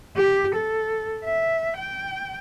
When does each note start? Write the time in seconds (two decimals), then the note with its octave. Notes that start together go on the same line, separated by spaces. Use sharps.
0.16 G4
0.55 A4
1.25 E5
1.77 G5